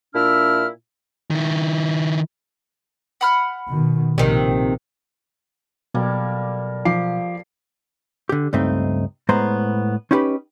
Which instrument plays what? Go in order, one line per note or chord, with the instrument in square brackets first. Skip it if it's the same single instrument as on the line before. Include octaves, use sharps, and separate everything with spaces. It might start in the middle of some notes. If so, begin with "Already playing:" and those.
[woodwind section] A#2 D4 E4 E5 F6
[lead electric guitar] D#3 E4
[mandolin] F#5 B5 F6
[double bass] B2 D#3
[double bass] A#1 [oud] C3 D#3
[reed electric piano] B2 F#3 [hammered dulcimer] G3 A#3 A4
[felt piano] F3 D6 C7
[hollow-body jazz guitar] D3 G4
C#2 G2 A3 C4 D#4 E5
A2 G#3 B3 C5 A#5 C6
C#4 D#4 E4 G4 B4 B5